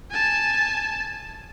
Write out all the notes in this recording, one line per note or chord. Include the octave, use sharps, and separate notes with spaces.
G#5 A5